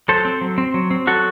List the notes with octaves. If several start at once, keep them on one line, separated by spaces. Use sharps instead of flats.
F#3 A4 C5
C4
F#3
C4
F#3
C4
F#3 F#4 A4